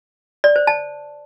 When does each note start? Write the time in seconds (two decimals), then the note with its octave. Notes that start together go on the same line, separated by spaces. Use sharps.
0.44 D5
0.56 C5
0.67 A5